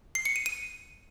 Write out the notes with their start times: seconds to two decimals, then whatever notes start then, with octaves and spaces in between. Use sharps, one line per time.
0.15 C7
0.25 C#7
0.36 D#7
0.46 D#7